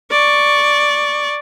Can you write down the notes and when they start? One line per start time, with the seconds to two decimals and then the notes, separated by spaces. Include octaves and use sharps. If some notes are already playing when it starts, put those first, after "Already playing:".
0.11 D5 C#6